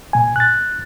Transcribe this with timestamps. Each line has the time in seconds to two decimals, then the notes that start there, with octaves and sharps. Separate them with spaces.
0.13 C2 A#2 G#5
0.36 F#6 A6